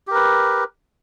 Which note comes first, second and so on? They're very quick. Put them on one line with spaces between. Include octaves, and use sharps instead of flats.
G4 A#4 B4